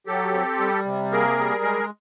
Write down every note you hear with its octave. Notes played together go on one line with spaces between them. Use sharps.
F#3 G4 A4
C4
G3
C3
A#3 G#4 A#4
G3
G#3